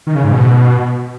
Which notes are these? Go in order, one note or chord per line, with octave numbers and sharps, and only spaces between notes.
D#3
C#3
G#2
B2